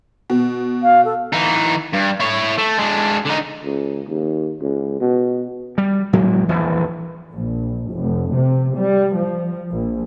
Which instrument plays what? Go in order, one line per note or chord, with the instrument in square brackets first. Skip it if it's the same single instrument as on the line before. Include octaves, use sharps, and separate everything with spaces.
[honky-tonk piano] B2
[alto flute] F5
A4
[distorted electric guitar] E3 D#4
G2
E4 C#5
A3
G#3 D4
D3 D#4
[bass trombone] C#2
D#2
C#2
B2
[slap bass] G3
A2 F#3 G#3 A#3
D#1 A#1 F2 E3
[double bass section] A#1
F1
C3
G3
F3
A#1